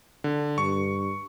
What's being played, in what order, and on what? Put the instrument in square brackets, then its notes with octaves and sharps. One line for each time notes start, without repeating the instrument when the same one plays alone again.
[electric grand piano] D3
[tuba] G2 [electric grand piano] C#6